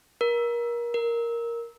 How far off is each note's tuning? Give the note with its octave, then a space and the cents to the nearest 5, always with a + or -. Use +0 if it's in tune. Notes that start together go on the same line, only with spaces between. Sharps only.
A#4 +30
A#4 +0